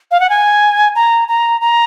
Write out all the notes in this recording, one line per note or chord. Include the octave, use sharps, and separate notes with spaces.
F5
F#5
G#5
A#5
A#5
A#5